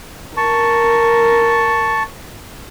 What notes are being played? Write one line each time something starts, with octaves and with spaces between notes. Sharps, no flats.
A#4 A5 C#6